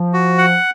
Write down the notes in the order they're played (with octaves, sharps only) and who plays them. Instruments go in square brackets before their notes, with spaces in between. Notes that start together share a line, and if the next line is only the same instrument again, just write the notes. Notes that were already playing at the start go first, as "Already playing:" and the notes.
Already playing: [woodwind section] F3
[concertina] F#4
F#5